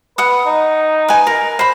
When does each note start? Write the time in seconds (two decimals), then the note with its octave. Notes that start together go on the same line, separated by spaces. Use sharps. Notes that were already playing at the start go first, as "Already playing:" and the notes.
0.18 B4 F#5 D#6
0.46 D#4
1.08 B4 G#5
1.27 A#4
1.59 C5 B5